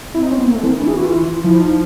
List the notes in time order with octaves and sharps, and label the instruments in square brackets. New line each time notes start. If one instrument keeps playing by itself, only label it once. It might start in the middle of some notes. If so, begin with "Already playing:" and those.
[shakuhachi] C4 [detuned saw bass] E4
[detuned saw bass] D#4
C#4
B3
A#3
A3
E3
D#3
[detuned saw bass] E3 [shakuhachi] D4
[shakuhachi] G#4
F#4
F4
[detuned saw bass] F3 [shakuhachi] E4
[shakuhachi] D#4